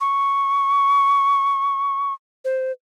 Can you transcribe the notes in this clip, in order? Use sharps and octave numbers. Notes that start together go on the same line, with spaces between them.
C#6
C5